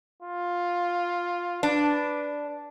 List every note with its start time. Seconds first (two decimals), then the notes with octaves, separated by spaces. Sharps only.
0.23 F4
1.63 D4 B4